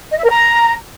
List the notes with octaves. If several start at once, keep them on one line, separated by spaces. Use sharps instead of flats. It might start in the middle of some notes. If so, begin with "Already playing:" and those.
D#5
E5
A#4
A#5